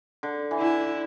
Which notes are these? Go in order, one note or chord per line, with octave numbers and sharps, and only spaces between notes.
D3
E3
D3 E4